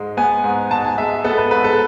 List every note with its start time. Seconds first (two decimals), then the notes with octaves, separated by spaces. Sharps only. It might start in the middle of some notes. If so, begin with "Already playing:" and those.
Already playing: G#2 G#3
0.17 B3 G#5
0.44 G#2
0.71 G#2 A5
0.84 G#5
0.98 G#3 E5
1.24 B3 A4
1.38 B4
1.51 G#2 B4
1.64 A4